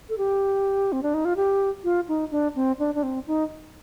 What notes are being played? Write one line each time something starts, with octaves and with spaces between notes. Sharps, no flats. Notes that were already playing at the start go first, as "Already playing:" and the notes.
A4
G4
C4
D4
D#4
F4
G4
F4
D#4
D4
C4
D4
D4
C4
D#4